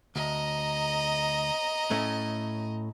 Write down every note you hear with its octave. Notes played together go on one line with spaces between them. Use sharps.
D2 D#5 A#5
A2 A3 C#4